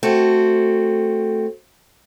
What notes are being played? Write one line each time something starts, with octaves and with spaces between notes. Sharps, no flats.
A3 C4 F#4